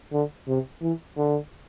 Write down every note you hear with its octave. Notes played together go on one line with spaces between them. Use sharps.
D3
C3
E3
D3